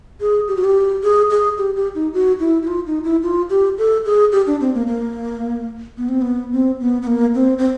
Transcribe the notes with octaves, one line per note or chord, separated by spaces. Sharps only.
G#4
G4
F#4
G4
G#4
G#4
G4
G4
D#4
F#4
E4
E4
F4
D#4
E4
F4
G4
A4
G#4
G4
D4
C4
A#3
A#3
B3
C4
B3
C4
B3
B3
A#3
C4
C4